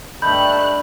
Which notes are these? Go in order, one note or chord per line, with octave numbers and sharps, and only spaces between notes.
G2 A3 D#4 B5 F#6 G6